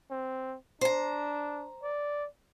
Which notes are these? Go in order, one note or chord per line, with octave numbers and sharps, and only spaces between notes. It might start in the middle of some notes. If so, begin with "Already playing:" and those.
C4
D4 C5 A#5
D5